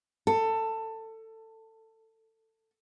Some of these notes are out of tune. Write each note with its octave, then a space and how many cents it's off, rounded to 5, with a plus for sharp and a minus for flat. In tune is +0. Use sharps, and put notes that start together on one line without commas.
A4 +20